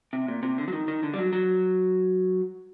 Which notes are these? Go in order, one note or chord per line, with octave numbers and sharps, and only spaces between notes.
C3
A#2
C3
D3
F#3
D#3
D#3
D3
G3
F#3
F#3